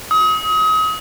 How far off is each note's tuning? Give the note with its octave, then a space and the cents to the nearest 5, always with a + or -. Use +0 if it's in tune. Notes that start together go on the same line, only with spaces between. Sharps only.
D#6 +35